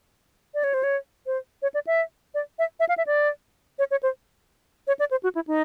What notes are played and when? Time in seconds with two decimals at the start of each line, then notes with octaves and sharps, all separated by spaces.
0.54 D5
0.64 C#5
0.74 C5
0.83 C#5
1.26 C5
1.62 C#5
1.74 D5
1.87 E5
2.34 D5
2.59 E5
2.80 E5
2.89 F5
2.98 E5
3.07 D5
3.79 C#5
3.91 C#5
4.03 C5
4.87 C#5
4.99 D5
5.11 C5
5.23 F#4
5.35 E4
5.47 D#4